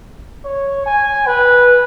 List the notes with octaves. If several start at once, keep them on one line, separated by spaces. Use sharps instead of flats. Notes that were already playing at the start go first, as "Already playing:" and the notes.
C#5
G#5
B4